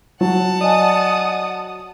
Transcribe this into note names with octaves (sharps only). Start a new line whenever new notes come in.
F#3 F#5 A5
D5 D#5 G#5 D#6